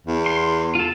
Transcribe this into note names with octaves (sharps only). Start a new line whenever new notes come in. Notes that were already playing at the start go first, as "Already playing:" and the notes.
E2
C6
F4 A4